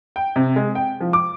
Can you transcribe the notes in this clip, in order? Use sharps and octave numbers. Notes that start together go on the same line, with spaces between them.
G5
C3
G#3
G5
F3
D6